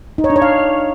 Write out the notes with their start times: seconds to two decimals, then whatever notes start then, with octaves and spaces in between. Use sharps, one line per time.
0.18 D#4
0.24 C#5
0.30 D4
0.36 C#5
0.42 F5